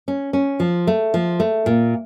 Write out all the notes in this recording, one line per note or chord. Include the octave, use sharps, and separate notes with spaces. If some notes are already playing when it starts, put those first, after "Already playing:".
C#4
C#4
F3
A3
F3
A3
A#2